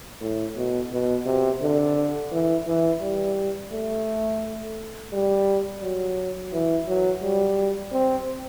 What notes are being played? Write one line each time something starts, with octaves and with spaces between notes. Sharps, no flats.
A2
B2
B2
C3
D3
E3
E3
G3
A3
G3
F#3
E3
F#3
G3
C4